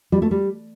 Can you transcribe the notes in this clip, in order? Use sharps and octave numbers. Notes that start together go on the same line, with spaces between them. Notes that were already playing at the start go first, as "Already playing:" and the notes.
G3
A3
G3